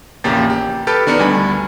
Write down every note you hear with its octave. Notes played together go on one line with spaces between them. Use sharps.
A#1 E2 C#3 A#3 G4 A6
G4
G4 A4 B4 G5 F6 A6
D#3 B3 D4 A#4 C#7
D2 G3 G#5 B5